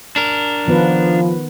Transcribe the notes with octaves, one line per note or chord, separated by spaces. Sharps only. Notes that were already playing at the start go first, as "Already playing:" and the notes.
D4 A#4
D#3 F3 B3 B4